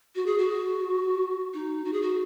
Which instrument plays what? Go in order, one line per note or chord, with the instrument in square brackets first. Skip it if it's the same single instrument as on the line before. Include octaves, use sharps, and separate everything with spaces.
[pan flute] F#4
G#4
F#4
D#4
F#4
G#4
F#4